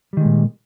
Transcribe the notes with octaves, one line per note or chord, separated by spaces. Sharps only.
A#2 D#3 G3 G#3